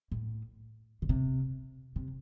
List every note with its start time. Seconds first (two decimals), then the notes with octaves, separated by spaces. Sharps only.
0.12 A2
1.02 C#3
1.09 C3
1.96 C3